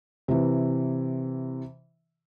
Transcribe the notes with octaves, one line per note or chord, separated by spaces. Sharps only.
C3 E3